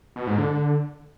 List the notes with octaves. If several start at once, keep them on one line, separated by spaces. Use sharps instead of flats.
B2
G#2
D3